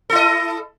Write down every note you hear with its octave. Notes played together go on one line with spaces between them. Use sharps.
E4 A4 D#5